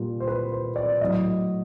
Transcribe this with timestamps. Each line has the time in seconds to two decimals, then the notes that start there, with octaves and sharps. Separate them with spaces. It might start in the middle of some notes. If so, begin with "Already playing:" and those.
Already playing: A#2 G3
0.20 C5
0.27 B4
0.52 C5
0.76 D5
1.01 A2 F#3 D#5